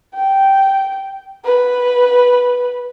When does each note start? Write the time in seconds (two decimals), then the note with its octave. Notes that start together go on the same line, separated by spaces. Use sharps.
0.15 G5
1.44 B4